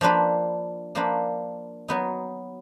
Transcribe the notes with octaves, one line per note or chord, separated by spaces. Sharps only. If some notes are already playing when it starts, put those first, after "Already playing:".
F3 A#3 D4 F4 B4
F3 A#3 D4 F4 B4
F#3 B3 D#4